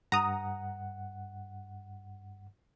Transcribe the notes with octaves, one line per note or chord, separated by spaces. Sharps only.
G2 F#5 A#5 D#6